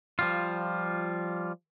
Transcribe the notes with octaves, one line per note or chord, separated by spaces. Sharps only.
F3 G3 F4